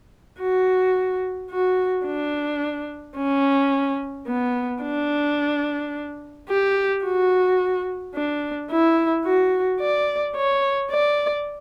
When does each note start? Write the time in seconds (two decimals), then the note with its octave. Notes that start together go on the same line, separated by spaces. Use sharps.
0.40 F#4
1.51 F#4
2.06 D4
3.17 C#4
4.28 B3
4.83 D4
6.49 G4
7.04 F#4
8.15 D4
8.71 E4
9.25 F#4
9.80 D5
10.36 C#5
10.92 D5